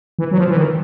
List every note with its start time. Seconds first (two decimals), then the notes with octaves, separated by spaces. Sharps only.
0.19 E3
0.32 F#3
0.38 F3
0.48 E3
0.57 D#3